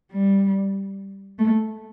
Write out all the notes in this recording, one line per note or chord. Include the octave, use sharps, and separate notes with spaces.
G3
A3